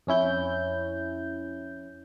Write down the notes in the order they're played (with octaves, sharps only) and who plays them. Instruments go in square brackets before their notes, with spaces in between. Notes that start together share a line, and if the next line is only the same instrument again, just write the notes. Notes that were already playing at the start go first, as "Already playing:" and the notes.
[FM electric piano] F2 C#4 E4 G6